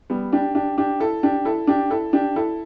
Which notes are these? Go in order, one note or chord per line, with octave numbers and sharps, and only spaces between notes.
G3 B3
D4 G4
D4 G4
D4 G4
E4 A4
D4 G4
E4 A4
D4 G4
E4 A4
D4 G4
E4 A4